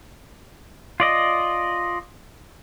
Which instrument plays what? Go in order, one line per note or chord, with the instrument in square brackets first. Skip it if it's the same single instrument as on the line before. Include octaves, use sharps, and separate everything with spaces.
[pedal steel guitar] F4 D5 D#5